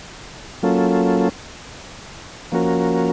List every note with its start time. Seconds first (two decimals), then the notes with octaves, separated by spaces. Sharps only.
0.63 F#3 A#3 C#4 F4 A4
2.52 F3 A#3 C#4 F#4 A#4